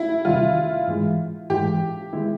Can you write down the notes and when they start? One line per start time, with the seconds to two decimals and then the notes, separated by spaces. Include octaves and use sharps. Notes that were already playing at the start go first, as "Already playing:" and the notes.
Already playing: E4
0.25 E2 C3 D#3 G3 F4
0.87 G#2 E3 G#3
1.50 G#2 E3 G#3 G4
2.13 D#3 G#3 B3 E4